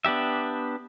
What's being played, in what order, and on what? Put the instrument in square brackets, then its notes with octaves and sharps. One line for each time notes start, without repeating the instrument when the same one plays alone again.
[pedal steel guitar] B3 D4 G4 E5